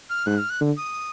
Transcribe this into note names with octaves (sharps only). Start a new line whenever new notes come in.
F6
G#2 F#6
F6
F#6
D3
D#6